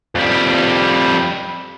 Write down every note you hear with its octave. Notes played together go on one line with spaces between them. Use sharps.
F2 G3